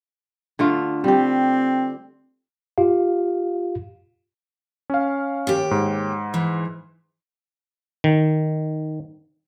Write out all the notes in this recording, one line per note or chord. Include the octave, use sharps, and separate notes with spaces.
D3 A3 F4
G3 C4 G4
F4 G4 F5
C#4 F5
D#2 G4
G#2
E3
D#3